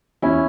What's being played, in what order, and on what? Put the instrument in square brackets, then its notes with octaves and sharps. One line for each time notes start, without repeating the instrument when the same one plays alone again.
[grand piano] E2 C#4 E4